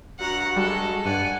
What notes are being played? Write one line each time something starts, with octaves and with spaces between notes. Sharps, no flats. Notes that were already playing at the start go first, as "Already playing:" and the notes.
G2 F#4 F#5 A#5
G3 G#3 A4
G2 D5 F#5 G#5